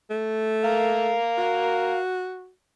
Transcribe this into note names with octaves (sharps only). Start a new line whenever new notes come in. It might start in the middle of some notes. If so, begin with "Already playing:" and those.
A3
A#4 F5
F#4